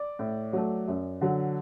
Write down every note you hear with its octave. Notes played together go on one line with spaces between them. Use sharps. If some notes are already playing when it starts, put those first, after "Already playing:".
Already playing: D5
A2
F#3 A3
F#2
D3 F#3